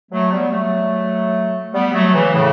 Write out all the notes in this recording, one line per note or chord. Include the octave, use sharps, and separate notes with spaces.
F#3 A3
G3 B3
F#3 A3
G3 B3
F#3 A3
C#3 E3
A2 C#3